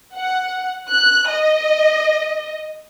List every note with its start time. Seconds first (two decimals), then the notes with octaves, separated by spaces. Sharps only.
0.15 F#5
0.88 F#6
1.28 D#5